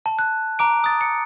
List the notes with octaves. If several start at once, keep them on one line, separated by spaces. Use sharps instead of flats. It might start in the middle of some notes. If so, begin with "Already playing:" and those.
A5
F#6
A#5 D6 D7
D#6 A6
C#7